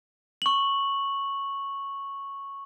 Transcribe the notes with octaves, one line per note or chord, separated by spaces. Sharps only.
C#6 F#7